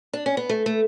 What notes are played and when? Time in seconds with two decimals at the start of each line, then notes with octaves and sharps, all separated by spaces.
0.13 D4
0.26 C#4
0.37 B3
0.49 A3
0.66 A3